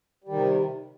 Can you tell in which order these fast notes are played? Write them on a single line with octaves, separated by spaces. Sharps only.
G3 D#3 C3